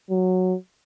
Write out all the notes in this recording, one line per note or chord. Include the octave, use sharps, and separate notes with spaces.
F#3